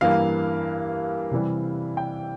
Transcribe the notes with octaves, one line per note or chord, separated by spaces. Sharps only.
G2 E3 A#3 F5
C3 E3 G3
G5